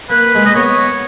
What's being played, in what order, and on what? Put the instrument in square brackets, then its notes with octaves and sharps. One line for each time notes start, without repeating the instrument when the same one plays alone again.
[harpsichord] A#3 [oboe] B4
[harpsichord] G#3
[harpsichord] A#3 [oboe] D#5
[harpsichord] B3 [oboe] C#5